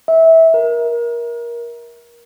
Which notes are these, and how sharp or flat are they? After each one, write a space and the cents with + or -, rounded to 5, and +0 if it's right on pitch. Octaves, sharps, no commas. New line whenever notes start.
E5 -20
A#4 +20